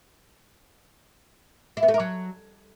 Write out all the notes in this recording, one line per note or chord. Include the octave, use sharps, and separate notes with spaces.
E4
B3
A3
A#4
F#3